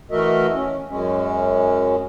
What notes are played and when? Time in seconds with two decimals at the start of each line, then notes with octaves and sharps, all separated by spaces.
0.11 E3 A3 F#4 A#4 D#5 E5
0.54 C#4
0.89 F#2 G#3 C#4